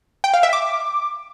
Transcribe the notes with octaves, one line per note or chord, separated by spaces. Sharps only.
G5
F5
E5
D6